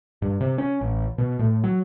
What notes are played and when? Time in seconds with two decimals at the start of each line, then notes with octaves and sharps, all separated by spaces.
0.22 G2
0.41 C3
0.58 C#4
0.81 A1
1.18 B2
1.39 A2
1.64 F#3